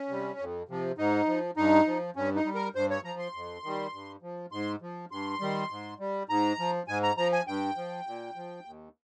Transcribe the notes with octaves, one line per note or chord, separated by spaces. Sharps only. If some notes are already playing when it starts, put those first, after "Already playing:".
Already playing: C#4
C3 G3
F2
C3 F3
G#2 D#4
F3
G2 D#4
F3
G2 C#4
D#4
G3
A#4
G2 C5
C#5
F3 A#5
C6
F2
D#3 G3
G2
F3
G#2 C6
F3
G2 C6
D#3 G3
G#2
G3
G#2 A#5
F3
G#2 G#5
A#5
F3 A#5
G#5
G2 G5
F3
A#2
F3
D#2